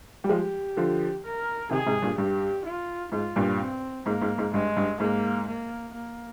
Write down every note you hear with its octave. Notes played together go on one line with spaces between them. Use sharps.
G3
F3 G#3 G4
D3 F3
A#4
C3 D#3 G#4
G#2 C3
G2 A#2
G2 G4
F4
G#2 F4
G2 A#2
C4
G#2 A#3
G#2
G#2
G2 G#3
G2
G#2 A#3
A#3
A#3